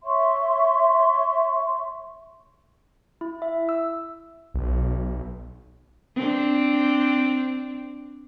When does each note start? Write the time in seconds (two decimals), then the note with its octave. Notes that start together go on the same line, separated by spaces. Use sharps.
0.04 C#5 E5 C6 C#6
3.21 E4
3.42 E5
3.69 E6
4.54 B1
6.16 C4 D4